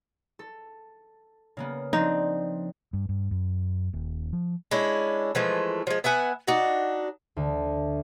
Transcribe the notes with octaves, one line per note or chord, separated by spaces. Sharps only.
A4
C#3 A#3 B3
F3 C4 D4 D#4
G2
G2
F#2
D#1
F3
G#3 C#4 D4 E4
E3 F3 G#3 A3
F3 G#3
B3 E5 F#5 G#5
D4 D#4 F#4
D2